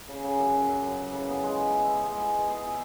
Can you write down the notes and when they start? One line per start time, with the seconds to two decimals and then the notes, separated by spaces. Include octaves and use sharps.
0.08 C#3
0.24 C#3
0.39 F#2
0.53 F#2
0.68 F#2
0.83 F#2
0.98 E3
1.13 C#3
1.29 B3
1.43 G#3
1.58 G#3
1.73 E4
1.88 B3
2.03 G#3
2.18 B3
2.33 G#3
2.48 G#4
2.63 E4